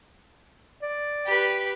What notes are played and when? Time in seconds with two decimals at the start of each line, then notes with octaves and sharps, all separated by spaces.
0.82 D5
1.26 G4 B4